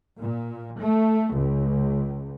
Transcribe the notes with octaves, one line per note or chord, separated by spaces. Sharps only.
A#2
A3
C#2